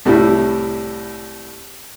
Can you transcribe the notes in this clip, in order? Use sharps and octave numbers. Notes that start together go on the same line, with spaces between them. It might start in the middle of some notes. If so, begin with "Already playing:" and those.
C2 A2 G3 E4